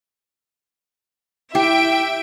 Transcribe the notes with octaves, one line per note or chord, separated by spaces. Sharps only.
E4 G4 E5 G5 D7